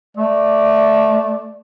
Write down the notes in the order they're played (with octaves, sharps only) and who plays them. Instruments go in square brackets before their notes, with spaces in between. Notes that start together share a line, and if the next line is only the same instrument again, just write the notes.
[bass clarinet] A3 [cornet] D5